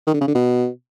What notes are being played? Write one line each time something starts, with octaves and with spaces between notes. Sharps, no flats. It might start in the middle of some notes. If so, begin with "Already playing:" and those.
D#3
D3
C#3
D3
B2